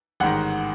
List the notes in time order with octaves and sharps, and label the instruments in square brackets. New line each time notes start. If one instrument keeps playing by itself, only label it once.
[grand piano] A1 G#2 D#3 F#5